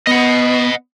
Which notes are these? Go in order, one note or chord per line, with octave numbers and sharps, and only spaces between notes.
B3 D#5 F#5